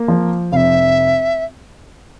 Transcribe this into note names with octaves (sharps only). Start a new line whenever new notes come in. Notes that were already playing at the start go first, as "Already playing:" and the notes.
Already playing: A#3
F3
F1 E5 F5